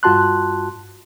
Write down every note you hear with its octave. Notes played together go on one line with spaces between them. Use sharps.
G2 F4 F#4 A5 C6 F#6